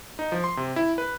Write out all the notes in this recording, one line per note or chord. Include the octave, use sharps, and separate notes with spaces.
D#4
F3
C6
C3
E4
B4